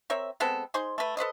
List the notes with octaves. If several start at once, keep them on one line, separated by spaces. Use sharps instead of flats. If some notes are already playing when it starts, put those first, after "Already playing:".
C4 A#4 C#5 E5
G#3 B3 C4 A4
D#4 G#4 C5 C6
A3 B4
A4 B4 C5 D#5